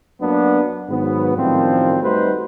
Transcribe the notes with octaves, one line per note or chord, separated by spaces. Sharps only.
F#2 F#3 A#3 B3 D4
G#2 D#3 F#3 B3
F#2 A2 D#3 F3 G3 C4
G3 A3 D#4 F#4 B4 C5